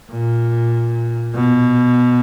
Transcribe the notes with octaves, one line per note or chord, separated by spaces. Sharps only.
A#2
B2